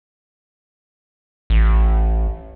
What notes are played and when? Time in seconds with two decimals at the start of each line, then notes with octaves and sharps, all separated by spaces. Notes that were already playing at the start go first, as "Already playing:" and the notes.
1.50 A1